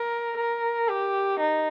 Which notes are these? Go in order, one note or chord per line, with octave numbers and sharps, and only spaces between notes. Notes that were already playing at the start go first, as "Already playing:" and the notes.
Already playing: A#4
A#4
G4
D#4